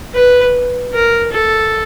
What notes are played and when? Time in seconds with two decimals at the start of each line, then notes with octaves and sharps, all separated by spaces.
0.14 B4
0.93 A#4
1.33 A4